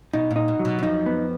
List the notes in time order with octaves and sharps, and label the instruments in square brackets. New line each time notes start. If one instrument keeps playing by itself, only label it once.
[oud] B2 [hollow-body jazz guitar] D#4
[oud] A#2
[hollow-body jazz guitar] D#4
[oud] B2
[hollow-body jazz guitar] F#3
[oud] B2
E3
[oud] F2 F3 [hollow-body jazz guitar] D#4
[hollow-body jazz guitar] B3